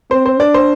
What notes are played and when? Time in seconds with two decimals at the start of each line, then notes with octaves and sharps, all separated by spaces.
0.11 C4 C5
0.26 C5
0.40 D4 D5
0.54 C5